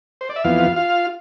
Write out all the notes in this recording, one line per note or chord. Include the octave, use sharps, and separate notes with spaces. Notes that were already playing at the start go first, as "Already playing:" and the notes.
C5
D5
E5
F2 E3 B3 F4 F5
F4 F5